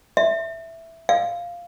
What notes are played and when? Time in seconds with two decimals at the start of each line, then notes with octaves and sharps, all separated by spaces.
0.17 E5
1.09 F5